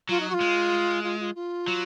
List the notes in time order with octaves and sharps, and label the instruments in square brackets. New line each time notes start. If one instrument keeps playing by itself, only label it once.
[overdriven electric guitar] F#3 [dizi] F4
[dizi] D#4
F#4
F4
[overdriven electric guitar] G#3
[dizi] F4
F4
F4
[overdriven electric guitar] F#3